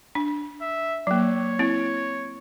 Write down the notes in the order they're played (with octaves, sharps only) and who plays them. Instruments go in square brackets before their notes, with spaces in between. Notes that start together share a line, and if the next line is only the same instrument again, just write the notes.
[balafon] D4
[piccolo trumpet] E5
[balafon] F#3 A#3 [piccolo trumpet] C#5
[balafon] C4 E4